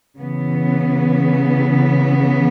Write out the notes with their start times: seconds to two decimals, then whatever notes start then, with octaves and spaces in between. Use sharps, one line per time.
0.18 C#3 E3 B3